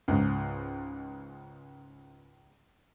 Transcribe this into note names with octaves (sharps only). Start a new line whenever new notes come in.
C#2 G#2